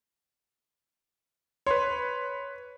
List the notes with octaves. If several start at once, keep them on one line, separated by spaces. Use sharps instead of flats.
B4 C#5 C6